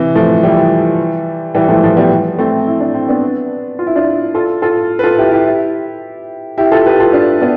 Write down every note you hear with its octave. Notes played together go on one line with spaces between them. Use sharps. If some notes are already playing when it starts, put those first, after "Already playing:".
Already playing: C3 E3
F3 A3
E3 G3
E3 G3
F3 A3
F3 A3
G3 B3
A3 C4
E4
D4
C4
B3 D4
F4
E4
D4 F4
F4 A4
F4 A4
B4
F4 A4
E4 G4
E4 G4
E4 G4
F4 A4
G4 B4
F4 A4
D4 F4
B3 D4